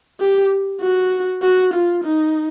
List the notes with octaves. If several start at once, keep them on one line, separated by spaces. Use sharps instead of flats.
G4
F#4
F#4
F4
D#4